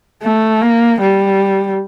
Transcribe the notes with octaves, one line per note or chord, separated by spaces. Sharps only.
A3
A#3
G3